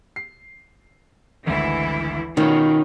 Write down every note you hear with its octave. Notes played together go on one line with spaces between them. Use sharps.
C7
G#1 D2 E3 E4
B2 D#3 C#4 D#4 F4 C#5